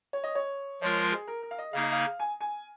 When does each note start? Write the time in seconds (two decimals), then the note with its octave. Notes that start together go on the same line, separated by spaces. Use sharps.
0.13 C#5
0.24 D#5
0.35 C#5
0.81 F3 G#3 F4 A#4 C#5
1.12 G#4
1.28 A#4
1.43 A#4
1.51 F5
1.58 D#5
1.73 C#3 A#3 D#4 G#4 F5
1.83 D#5
1.92 F5
2.19 G#5
2.41 G#5